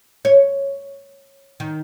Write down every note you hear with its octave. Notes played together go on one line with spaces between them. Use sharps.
C#5
D#3